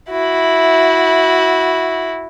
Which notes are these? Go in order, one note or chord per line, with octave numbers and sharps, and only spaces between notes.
E4 F#4